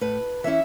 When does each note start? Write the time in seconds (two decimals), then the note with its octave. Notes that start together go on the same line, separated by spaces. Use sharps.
0.01 A2 B4
0.44 E3 C#4 E4 E5